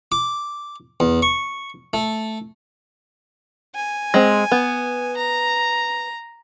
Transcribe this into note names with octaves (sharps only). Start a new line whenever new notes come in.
D6
E2
C#6
A3
G#5
G#3 C4
B3
A#5